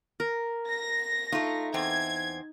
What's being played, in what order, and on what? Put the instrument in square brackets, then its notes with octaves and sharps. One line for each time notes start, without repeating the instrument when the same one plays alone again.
[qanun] A#4
[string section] A#6
[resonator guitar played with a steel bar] A3 F4 [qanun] D#4
[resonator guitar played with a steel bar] E2 C4 [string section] G#6